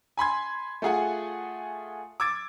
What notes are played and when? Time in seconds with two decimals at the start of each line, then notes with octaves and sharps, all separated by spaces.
0.17 G#5 B5 C6 G#6
0.82 A3 F4 G#4 F#5 G#5
2.20 D6 E6 G#6 A6 D7